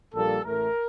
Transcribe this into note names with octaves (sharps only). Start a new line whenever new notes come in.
A#1 A#2 G3 A#3 A4
A1 A2 A3 A#4